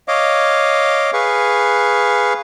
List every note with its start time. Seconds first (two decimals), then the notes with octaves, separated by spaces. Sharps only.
0.08 C#5 D#5 F5 D6
1.13 G#4 B4 F5 C#6